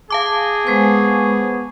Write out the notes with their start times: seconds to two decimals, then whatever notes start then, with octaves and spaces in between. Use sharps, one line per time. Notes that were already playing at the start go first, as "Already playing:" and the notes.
0.10 G#4 F5 A5 D6
0.67 G#3 B3 C5 C#6